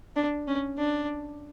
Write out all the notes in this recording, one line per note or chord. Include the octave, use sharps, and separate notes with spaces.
D4
C#4
D4